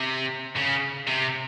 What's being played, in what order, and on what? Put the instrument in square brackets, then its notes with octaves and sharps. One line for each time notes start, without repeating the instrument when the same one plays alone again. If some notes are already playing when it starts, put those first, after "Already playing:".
Already playing: [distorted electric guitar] C3
C#3
C3